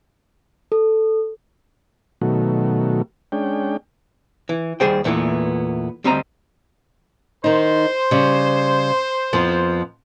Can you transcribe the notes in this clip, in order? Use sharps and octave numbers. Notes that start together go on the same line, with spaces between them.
A4
B2 D#3 F#3 A3
G#3 C#4 D4 G5
E3
D#2 G3 G#4 C5 G5
E2 A#2 E3 A3 B3
D2 G3 C4 C5 D#5 A#5
D#3 D#4 C5
C#3 G3
F2 F3 B3